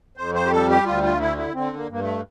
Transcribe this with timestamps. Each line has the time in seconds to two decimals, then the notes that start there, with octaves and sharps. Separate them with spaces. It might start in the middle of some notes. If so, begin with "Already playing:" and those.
0.17 F2 C5
0.35 C5
0.46 G4
0.52 G3 A4
0.69 G4
0.86 D2 F4
1.03 F4
1.20 D3 E4
1.38 E4
1.54 D3 C4
1.77 A#3
1.89 G2 A#3
2.00 A3